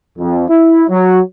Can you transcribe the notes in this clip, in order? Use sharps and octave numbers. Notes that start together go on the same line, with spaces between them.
F2
E4
F#3